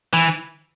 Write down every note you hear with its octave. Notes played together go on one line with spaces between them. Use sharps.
E3